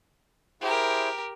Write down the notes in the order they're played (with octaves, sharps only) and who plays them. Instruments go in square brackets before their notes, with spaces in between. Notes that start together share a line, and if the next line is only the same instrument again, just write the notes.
[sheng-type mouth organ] E4 G#4 C5 [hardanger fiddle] G4 A#4